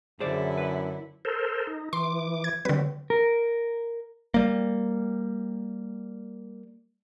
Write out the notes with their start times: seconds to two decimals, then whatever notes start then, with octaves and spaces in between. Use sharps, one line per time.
0.20 F#2 D3 E4 G#4 C5 D5
0.58 B4
1.25 A4 A#4 C5
1.67 D#4
1.93 E3 C6 D6
2.44 G#6
2.65 D3 F#3 G3 C4 B4
3.10 A#4
4.34 G3 A#3